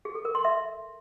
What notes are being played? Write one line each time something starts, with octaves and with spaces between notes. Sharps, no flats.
G#4
A4
A#4
C6
E5